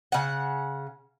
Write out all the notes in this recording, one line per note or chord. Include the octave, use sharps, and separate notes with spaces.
C#3 F#5